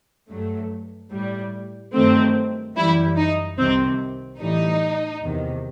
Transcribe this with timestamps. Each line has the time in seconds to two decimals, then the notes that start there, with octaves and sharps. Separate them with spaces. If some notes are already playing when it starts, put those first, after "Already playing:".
0.31 G2 F#3 A3
1.12 A2 G3
1.94 G2 D#3 F#3 A3 C4
2.76 F#2 E3 G3 E4
3.17 D#4
3.58 C2 C3 D#3 C4
4.40 A2 E3 G3 D#4
5.22 E2 C3 D#3